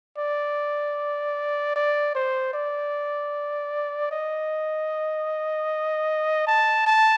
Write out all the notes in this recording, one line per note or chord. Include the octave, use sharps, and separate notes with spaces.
D5
D5
C5
D5
D#5
A5
A5